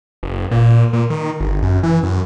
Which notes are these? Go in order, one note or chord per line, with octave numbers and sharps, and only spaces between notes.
F#1
A#2
A#2
D#3
G1
F#2
E3
F#2